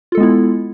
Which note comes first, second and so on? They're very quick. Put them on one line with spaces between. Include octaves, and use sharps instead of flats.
F4 A4 G#3 B3 E4